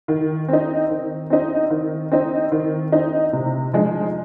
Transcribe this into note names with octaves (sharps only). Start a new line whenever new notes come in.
D#3
C4 D#4
D#3
C4 D#4
D#3
C4 D#4
D#3
C4 D#4
C3
F3 G#3 D#4